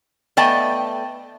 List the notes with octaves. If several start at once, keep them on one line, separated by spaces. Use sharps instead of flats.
A3 B3 D5 D#5 G5 A5